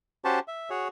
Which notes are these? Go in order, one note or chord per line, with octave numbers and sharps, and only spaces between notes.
C#4 F#4 G4 C5 A5
E5
F#4 G#4 C#5